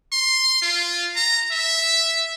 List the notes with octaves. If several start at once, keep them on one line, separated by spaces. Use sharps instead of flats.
C6
F4
A#5
E5